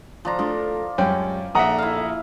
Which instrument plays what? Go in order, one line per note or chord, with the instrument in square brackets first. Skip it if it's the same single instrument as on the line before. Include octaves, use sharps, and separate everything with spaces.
[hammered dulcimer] F3 D4 A#5
[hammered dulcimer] F3 [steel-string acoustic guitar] A3 D4
[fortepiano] F#2 C#4 G5 [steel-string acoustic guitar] G3 G#3
[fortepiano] A#1 E5 [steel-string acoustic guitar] D#4 A4 C#5 [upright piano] F#5 A#5 D#6
[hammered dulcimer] E4 F5